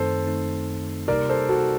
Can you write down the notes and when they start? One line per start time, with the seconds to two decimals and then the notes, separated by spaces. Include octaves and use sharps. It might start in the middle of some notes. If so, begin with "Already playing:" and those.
Already playing: F#2 D#3 A3 C4 D#4 A4 C5
0.27 F#2 D#3 A3 C4 D#4
1.08 C3 G3 A#3 D#4 G4 A#4 D5
1.29 A4 C5
1.49 F#4 A4